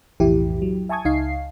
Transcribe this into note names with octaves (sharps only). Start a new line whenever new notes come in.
B1 F2 A2 E3 E4 G4
F#3
E5 G#5 A5 C#6 D#6 G#6
C#2 D#4 F5 C7